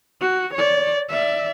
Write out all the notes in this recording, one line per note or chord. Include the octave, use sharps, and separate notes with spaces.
F#4
C#5 D5
D5 E5